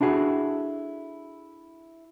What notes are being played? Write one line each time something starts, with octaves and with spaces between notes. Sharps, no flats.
D4 E4 F#4 G#4 A4